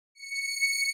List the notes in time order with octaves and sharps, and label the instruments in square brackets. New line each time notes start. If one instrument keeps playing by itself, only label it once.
[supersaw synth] C#7